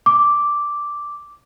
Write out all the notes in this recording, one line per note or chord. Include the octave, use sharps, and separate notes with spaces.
D6